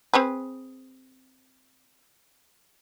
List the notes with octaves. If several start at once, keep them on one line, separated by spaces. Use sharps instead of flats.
C4 G#4 B4